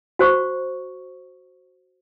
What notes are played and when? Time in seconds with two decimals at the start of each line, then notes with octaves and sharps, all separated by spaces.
0.19 F#4 C5 C#6